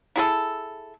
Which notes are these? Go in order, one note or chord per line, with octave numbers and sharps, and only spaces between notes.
E4 G#4 A4